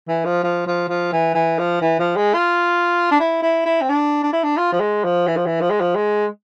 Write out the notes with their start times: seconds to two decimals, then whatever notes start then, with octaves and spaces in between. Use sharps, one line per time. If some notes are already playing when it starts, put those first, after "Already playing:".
0.08 E3
0.25 F3
0.43 F3
0.66 F3
0.88 F3
1.12 E3
1.34 E3
1.59 F3
1.81 E3
1.99 F3
2.16 G#3
2.34 F4
3.11 D4
3.20 E4
3.42 E4
3.66 E4
3.81 C4
3.89 D4
4.23 D4
4.33 E4
4.43 D4
4.57 F4
4.72 F3
4.80 G#3
5.04 F3
5.27 E3
5.36 F3
5.46 E3
5.61 F3
5.70 G#3
5.80 F3
5.95 G#3